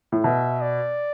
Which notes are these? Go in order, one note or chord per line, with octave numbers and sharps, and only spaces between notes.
A2
B2 E5
D5